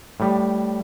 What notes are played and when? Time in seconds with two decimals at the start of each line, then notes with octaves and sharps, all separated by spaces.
0.20 A2 G3